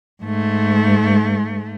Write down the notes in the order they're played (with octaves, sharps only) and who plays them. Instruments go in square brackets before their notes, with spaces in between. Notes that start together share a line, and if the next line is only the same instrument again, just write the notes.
[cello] G#2 A3